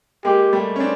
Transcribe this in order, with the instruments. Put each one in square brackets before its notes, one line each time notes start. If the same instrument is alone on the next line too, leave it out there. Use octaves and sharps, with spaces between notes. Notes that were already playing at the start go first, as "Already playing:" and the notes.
[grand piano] G#3 A#3 [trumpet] G4
[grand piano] G3 A3
C#4
C4 D4